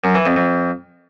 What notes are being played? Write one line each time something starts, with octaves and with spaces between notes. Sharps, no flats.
F#2
E3
F2
F2